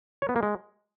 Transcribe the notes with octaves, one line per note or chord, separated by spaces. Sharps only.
C#5
B3
A#3
G#3